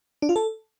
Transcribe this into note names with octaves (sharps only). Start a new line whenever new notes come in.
D4
F4
A4